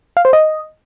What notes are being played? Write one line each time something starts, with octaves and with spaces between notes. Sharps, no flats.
F5
C5
D#5